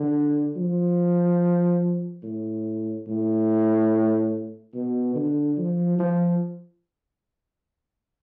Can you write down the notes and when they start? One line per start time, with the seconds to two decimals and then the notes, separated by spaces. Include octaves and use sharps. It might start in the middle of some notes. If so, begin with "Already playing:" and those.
Already playing: D3
0.56 F3
2.23 A2
3.07 A2
4.74 B2
5.15 D3
5.58 F3
5.99 F3